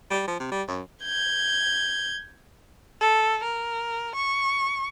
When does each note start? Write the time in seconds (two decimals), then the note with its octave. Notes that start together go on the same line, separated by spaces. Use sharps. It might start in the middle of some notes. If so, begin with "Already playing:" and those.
0.10 G3
0.27 F3
0.39 C3
0.51 G3
0.68 F#2
1.03 G6 G#6
3.01 A4
3.44 A#4
4.16 C#6